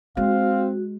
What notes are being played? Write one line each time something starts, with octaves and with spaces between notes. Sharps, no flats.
G#3 C4 F#4 F5